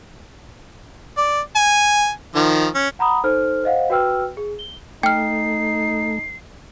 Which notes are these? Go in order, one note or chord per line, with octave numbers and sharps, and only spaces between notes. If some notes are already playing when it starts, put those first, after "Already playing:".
D5
G#5
D#3 F3
C#4
F#5 A#5 B5 D#6
D#4 A4 C5 F6
C5 D#5 F5 F#5
F#4 B4 G5 E6 F6
G#4
G7
A3 D#4 G5 F6 C7